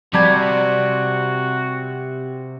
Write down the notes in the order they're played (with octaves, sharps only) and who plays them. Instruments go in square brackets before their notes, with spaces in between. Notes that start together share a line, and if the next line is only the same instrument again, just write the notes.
[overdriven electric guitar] C3 [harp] G3 A5 G#6 [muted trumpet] F#4